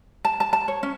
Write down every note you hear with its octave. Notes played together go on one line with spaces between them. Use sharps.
A5
A5
A5
C#5
C#4